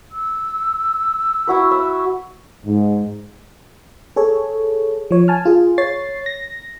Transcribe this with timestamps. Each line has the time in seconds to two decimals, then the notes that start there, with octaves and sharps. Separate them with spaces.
0.12 E6
1.47 E4 F#4 B4
1.71 E5
2.66 G#2
4.16 G#4 A4 C#5
5.11 F3 C#5
5.28 G#5 A5 F6
5.45 F4 G#4
5.78 C#5 A6 C7
6.26 A#6